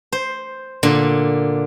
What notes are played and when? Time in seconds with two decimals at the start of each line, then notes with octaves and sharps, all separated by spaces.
0.12 C5
0.83 A#2 D3